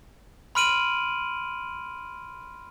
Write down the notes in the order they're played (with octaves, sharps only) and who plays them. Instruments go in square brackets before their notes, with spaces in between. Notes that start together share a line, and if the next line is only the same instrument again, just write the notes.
[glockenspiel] B5 C6 F6 D7 D#7 F#7